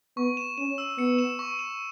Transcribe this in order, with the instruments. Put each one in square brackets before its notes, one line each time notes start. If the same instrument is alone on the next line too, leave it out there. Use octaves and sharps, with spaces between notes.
[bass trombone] B3 [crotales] C#6
[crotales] E7
[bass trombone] C#4 [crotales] E7
[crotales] E6
[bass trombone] B3 [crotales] C#7
[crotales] E7
C#6
E7